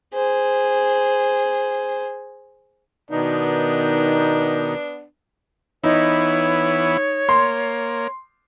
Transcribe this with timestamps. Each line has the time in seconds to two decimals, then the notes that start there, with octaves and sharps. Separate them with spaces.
0.14 G#4 C5
3.11 B2 D#3 B3 D4 D#4
5.84 E3 B3 D#4 E4 C#5
7.29 A#3 C6